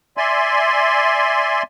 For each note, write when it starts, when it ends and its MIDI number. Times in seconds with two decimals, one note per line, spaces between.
0.17 1.63 74
0.17 1.63 76
0.17 1.63 80
0.17 1.63 84